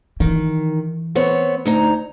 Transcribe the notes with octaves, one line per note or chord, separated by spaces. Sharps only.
D#3 E3
B3 C4 C#5
D2 D#4 A#5